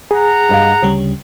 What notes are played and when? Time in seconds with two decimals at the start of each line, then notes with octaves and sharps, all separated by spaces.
0.11 G#4 F#5 A#5
0.49 G2 D#5 F5
0.82 D2 C#3 G3 C#5